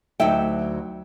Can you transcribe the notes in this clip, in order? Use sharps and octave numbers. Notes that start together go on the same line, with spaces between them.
D2 F#3 D#4 E5 G5